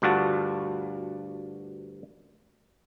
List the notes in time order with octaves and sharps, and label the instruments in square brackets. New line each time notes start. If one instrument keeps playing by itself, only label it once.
[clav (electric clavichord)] D2 G2 F4 F#4 A5